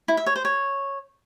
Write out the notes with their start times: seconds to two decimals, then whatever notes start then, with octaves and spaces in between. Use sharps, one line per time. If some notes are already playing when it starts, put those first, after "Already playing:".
0.08 E4
0.17 E5
0.26 C#5
0.36 C5
0.45 C#5